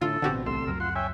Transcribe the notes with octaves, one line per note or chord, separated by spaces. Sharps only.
A2 D3 C#4 D4 E4 F4 A4
A1 B2 D3 C4 F#4 G4
C2 C3 A3 C6 E6
C#2 F#2 F#3 A#4
F4 F#5 C6
C#5 E5 G5 G#5